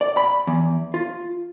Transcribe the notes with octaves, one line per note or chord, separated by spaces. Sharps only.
D5
B5
E2
F4